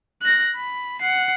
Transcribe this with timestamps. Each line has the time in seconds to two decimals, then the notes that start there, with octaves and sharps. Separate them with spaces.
0.22 F#6 A#6
0.56 B5
1.01 F#5 C7